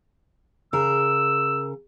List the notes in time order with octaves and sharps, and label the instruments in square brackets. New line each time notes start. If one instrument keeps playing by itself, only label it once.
[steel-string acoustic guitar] C#3 A#4 [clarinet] E6